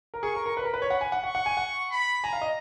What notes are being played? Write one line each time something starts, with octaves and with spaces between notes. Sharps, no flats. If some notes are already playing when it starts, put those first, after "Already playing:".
A#4
G#4 C#6
A#4
A#4
B4 B5
A#4
B4
C#5
F#5
G#5
F#5
F#5 C#6
F#5
G#5
F#5
B5
G#5 A#5
F5
D#5